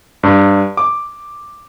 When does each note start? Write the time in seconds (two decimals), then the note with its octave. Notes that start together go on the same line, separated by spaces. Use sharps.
0.23 G2
0.77 D6